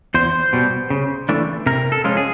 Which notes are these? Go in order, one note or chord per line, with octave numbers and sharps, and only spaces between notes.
E2 C5
B2 G3
C#3
E3 A3 D4
C3 A#4
A4
F3 G#3 C#4 F4
G#4